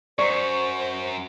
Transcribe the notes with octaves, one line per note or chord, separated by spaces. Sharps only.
F#2 C5 D5 A#5 C#6